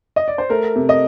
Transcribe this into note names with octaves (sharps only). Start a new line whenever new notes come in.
D#5
D5
C5
A3 A#4
C3
D#5